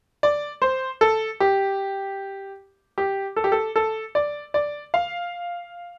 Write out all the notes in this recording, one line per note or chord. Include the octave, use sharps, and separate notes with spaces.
D5
C5
A4
G4
G4
A4
G4
A4
A4
D5
D5
F5